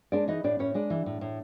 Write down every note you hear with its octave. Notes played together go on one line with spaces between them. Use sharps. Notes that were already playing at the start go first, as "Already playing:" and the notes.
G#3 D4 D5
E3 D#4 D#5
A2 D4 D5
A2 C#4 C#5
G#3 D4 D5
E3
A2
A2